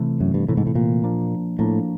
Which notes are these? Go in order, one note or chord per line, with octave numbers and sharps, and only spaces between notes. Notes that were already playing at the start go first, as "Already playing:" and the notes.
Already playing: C3 E3 A3
F#2
G2
A2 C3 E3 A3
G#2
A2
A#2
F3 A#3 D4
A2 F3 A#3 D4